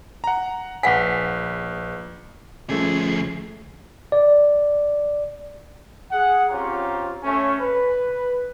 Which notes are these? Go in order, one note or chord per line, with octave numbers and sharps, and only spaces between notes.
F#5 A#5
A#1 B4 F5 F#5 G#5 B6
D2 F3 A3 C#4 G#4
D5
G#4 F#5
C4 C#4 F4 G4 C#5 A#5
A3 C#4
B4